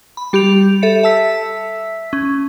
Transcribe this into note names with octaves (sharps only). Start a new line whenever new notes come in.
B5
G3 G4 B5 G6 F7
A4 E5 C#7
E5 A5 E6 B6
C#4